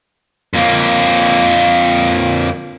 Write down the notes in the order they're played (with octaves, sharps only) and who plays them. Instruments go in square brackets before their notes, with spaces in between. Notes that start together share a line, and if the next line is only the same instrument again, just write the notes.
[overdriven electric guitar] F2 A#3